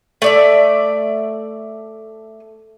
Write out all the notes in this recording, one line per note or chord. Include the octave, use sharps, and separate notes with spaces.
A3 D5 E5